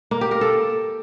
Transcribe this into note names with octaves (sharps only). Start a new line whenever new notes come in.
A#3
G4
A#4
A4